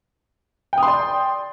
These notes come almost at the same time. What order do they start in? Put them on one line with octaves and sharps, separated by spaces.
G5 D#6 C6 D5